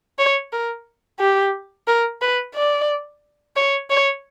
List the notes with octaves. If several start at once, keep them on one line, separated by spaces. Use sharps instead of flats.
C#5
A#4
G4
A#4
B4
D5
C#5
C#5